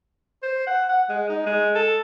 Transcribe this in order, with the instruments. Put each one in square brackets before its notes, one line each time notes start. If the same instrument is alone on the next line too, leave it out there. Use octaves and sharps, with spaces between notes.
[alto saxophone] C5
F#5
F#5
G#3
D#4
G#3
A4